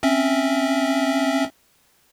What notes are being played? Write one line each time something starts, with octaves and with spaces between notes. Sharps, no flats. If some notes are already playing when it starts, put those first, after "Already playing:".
C4 C#4 E5